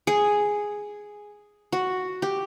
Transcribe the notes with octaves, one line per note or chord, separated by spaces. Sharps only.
G#4
F#4
G4